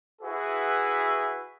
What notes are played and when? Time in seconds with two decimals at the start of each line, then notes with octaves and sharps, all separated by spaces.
0.22 E4 F#4 G#4 B4 E5